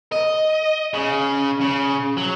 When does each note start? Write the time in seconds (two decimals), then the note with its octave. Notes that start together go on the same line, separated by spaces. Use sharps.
0.12 D#5
0.93 C#3
1.61 C#3
2.17 F#3